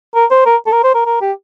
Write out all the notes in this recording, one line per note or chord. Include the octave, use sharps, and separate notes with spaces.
A#4
C5
A#4
A4
A#4
C5
A#4
A#4
G4